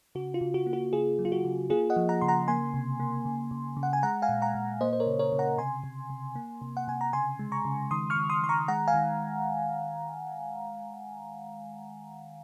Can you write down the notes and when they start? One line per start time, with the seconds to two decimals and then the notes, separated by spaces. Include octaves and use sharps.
0.15 C#3 F#4
0.34 F4
0.41 C#3
0.54 F#4
0.67 A#3
0.73 F#4
0.93 C#3 F4 G#4
1.19 F#3
1.25 F4
1.32 F#4
1.45 C#3
1.70 A#3 F4 G#4
1.90 D#5 F#5
1.96 F3
2.09 F#5 A#5
2.21 C#3 C6
2.28 F#5 A#5
2.48 A#3 G#5 C6
2.74 C3
3.00 A#3
3.25 C#3
3.51 C#3
3.77 C#3
3.83 F#5
3.93 G#5
4.03 G#3 F#5 A#5
4.22 F5 G#5
4.29 A#2
4.42 F#5 A#5
4.55 A#2
4.81 A#3 C5 D#5
4.93 C5
5.00 A#4 C#5
5.06 C#3
5.19 A#4 C#5
5.32 C#3
5.39 F#5 A#5
5.58 C3 G#5 C6
5.84 C3
6.10 C3
6.36 A#3
6.61 C3
6.77 F#5
6.88 C3 G#5
7.01 A#5
7.13 C#3 G#5 C6
7.39 G#3
7.52 A#5 C#6
7.65 C#3
7.91 D#3 C6 D#6
8.10 C#6 F6
8.16 D#3
8.30 C6 D#6
8.43 D#3 C6
8.49 A#5 C#6
8.68 G#3 F#5 A#5
8.88 F5 G#5
8.94 D#3